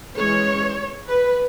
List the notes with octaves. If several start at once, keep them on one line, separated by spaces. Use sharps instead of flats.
E3 G#3 C#4 C#5
B4